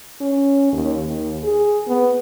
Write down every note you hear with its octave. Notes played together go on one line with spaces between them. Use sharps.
C#4
D#2
D#2
G#4
B3